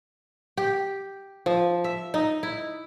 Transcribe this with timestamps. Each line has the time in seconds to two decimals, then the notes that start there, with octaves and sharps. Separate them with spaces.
0.57 G4
1.46 F3
1.84 E5
2.14 D#4
2.43 E4